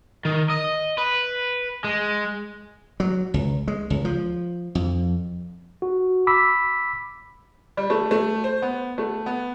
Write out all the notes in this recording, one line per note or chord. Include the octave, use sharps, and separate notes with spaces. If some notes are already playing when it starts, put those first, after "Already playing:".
D#3
D#5
B4
G#3
F#3
C#2
G#3
C#2
F3
F2
F#4
B5 D6 E6 B6
G3
A3
A3
C5
B3
A3
B3